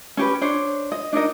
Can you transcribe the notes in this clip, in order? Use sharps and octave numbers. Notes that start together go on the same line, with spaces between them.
C#4 G4 B4
D4 C5 C#5
D#5
D4 D#4 A#4 D#5